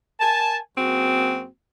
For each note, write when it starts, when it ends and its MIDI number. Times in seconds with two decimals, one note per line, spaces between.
0.20 0.57 70
0.20 0.57 80
0.20 0.57 81
0.77 1.46 42
0.77 1.46 58
0.77 1.46 60
0.77 1.46 66
0.77 1.46 68